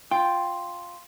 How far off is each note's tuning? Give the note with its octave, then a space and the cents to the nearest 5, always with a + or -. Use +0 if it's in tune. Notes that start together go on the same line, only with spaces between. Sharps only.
F4 +0 G5 +0